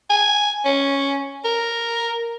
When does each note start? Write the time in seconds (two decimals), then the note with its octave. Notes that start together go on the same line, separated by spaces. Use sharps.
0.10 G#5
0.65 C#4
1.45 A#4